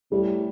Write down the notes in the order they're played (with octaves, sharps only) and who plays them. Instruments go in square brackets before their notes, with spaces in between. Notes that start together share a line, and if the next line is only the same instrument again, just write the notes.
[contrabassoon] A2 [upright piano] G3